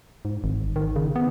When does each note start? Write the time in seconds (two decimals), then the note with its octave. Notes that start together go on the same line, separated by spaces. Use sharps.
0.25 G#2
0.44 G#1
0.76 D#3
0.96 C#3
1.16 B3